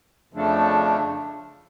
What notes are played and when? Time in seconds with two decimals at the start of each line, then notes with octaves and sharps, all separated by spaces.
0.33 F2 C#3 F3 A3 D4